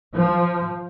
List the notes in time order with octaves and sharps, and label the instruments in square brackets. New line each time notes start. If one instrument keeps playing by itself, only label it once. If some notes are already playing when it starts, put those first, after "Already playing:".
[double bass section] F3